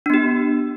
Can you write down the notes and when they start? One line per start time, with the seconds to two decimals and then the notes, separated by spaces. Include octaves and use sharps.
0.06 D4
0.10 B3
0.14 G4